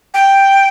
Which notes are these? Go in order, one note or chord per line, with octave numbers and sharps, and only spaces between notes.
G5